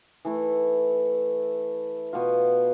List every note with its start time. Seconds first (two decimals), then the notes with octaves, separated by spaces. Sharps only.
0.25 E3 A3 E4
2.13 B2 B3 F4